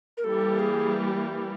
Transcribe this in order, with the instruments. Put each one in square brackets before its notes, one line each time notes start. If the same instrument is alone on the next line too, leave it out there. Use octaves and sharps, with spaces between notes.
[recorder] A#4
[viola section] E3 G3 A#3 [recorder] A4
[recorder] G#4